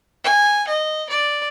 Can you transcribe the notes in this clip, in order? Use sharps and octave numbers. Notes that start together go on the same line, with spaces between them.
G#5
D#5
D5